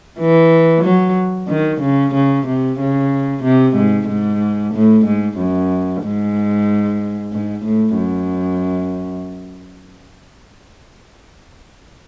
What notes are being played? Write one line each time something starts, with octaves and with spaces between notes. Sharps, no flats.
E3
F#3
D#3
C#3
C#3
C3
C#3
C3
G#2
G#2
A2
G#2
F#2
G#2
G#2
A2
F#2